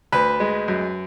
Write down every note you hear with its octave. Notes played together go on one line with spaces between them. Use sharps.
D2 B4
G#3
F#2